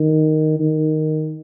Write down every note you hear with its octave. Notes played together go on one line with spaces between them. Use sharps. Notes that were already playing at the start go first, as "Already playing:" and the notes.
Already playing: D#3
D#3